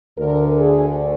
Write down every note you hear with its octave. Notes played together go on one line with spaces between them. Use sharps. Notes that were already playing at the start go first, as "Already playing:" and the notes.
D2 D3 A#4
G#4